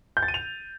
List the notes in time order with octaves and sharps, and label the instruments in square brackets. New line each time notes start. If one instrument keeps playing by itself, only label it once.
[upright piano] G6
A6
D#7
F7